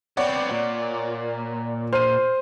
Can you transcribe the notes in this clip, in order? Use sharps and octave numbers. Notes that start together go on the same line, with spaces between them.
B3 C4 C#5 D5 F#5
A#2
C5 F6 D#7